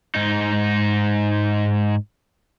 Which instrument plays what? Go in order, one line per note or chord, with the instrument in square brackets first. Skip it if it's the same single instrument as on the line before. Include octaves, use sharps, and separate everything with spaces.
[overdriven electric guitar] G#2 D#4